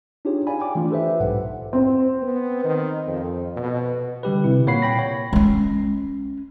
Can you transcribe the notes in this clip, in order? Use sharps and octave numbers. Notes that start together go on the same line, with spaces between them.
D4 D#4 F4 G4 G#4 C#5
D5 F5 G#5 B5
G5 G#5 D6
E3 A3 D4 F4
G4 A4 B4 C5 E5
B1 G#2 F#5
C4
B3
D#3
F2
B2
D3 G3 G4 B4
C3 E4
A#2 A#3 C#5 F#5 B5 C7
G5 B5 A#6
C#5
G#3 C#4